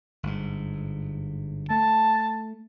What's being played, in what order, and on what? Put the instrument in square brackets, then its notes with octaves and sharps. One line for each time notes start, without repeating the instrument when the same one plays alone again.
[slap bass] G1 G#2
[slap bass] A3 [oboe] A5